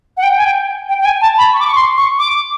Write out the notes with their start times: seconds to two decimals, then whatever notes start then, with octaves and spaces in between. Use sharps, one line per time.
0.17 F#5
0.23 G5
0.37 G#5
0.44 G5
0.89 G5
1.00 G5
1.05 G#5
1.21 A5
1.37 B5
1.53 C#6
1.60 D6
1.67 C#6
1.75 C6
1.97 C#6
2.19 D6